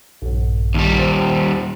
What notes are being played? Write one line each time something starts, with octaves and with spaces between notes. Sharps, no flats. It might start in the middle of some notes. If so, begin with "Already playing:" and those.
A#1 G2
D#2 G3
C5 G5